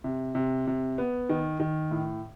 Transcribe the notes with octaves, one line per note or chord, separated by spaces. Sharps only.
C3
C3
C3
B3
D#3
D#3
A2